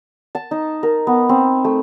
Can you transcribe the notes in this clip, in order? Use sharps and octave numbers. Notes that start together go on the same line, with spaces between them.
A5
D#4
A#4
B3
C4
A3